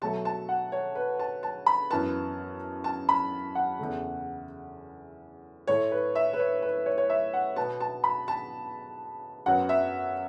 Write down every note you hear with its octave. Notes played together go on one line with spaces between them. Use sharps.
B2 F#3 A3 A5
A5
F#5
C#5
B4
A5
A5
B5
F#2 E3 B3 A5
A5
B5
F#5
E2 C#3 A3
A2 A3 C#5
B4
E5
B4
C#5
B4
C#5
C#5
E5
F#5
B2 B3 A5
A5
B5
A5
F#2 F#3 B3 F#5
E5